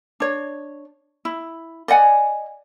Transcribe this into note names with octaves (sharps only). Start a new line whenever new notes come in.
D4 C#5
E4
D5 D#5 F#5 G#5